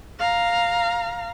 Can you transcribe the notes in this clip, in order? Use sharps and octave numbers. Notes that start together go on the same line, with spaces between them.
F5 A#5